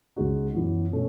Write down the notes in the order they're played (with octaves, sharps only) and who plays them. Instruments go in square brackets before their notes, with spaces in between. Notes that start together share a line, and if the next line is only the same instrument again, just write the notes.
[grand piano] C#2 C#3 G#3 D#4 F#4
F#2 E3 B3
B2 A3 C#4